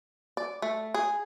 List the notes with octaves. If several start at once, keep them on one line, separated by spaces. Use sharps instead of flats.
D5
A3
G#4